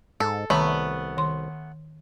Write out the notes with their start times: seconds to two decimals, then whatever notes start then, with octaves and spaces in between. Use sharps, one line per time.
0.20 G#2 A4
0.50 C2 D#3 A3 B3 A#5
1.17 D#3 C6